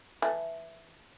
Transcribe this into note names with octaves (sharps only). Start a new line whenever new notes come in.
E3 A3